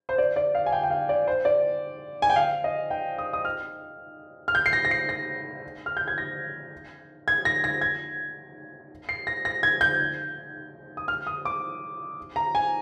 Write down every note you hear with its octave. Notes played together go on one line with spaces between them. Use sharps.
C5
D5
D5
F5
G#5
G5
G5
F5
D5
C5
D5
G#5
G5
F5
D#5
G5
D#6
D#6
F6
F6
G6
C7
A#6
A#6
C7
A#6
F6
G6
G#6
A#6
G#6
A#6
A#6
G#6
C7
A#6
A#6
G#6
G6
D#6
F6
D#6
D6
A#5
G#5